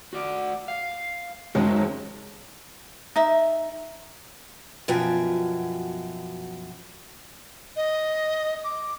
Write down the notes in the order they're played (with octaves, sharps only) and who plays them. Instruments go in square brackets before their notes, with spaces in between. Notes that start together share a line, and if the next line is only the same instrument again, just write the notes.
[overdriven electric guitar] F#4 D5
F5
[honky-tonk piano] F#1 D#2 F#3 [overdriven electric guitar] G#2 C4 [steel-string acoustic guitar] G#3
[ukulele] D#4 E5
[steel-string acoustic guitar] F#2 B2 F3 G5 G#5
[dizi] D#5
D6